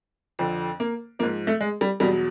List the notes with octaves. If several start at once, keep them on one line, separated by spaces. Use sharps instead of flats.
F2 D3 F3
A#3
G#2 F3 A#3
A3
G#3
G3
E2 B2 F#3 G3